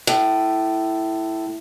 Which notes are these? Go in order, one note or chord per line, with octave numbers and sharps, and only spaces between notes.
A2